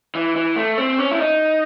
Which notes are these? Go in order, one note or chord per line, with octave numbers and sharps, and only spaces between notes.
E3
E3
A3
C4
C#4
E4
D#4